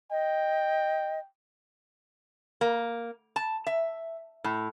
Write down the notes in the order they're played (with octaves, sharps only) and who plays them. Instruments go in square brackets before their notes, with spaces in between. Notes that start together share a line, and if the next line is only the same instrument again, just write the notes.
[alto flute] D#5 [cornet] G5
[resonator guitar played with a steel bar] A#3
A5
E5
A2